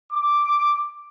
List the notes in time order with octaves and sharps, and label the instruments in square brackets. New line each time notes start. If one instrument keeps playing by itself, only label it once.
[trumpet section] D6